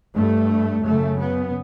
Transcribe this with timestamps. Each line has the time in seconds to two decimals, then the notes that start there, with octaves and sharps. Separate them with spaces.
0.14 G2 A3
0.84 F#2 C#3 A3
1.20 B3